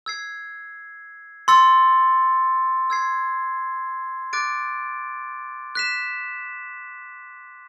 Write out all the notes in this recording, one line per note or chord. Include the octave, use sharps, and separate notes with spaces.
E6 G#6 C7
C6 E6 A6 C#7
E6 G#6 C7
D6 F#6 A6 D7
F#6 B6 E7